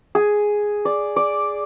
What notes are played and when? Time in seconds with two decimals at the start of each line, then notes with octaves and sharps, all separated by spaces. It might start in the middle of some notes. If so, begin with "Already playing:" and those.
0.15 G#4
0.85 D5
1.16 D5